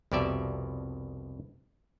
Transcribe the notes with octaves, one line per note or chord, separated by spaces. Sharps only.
C2 F2 B2 G4 D5 E5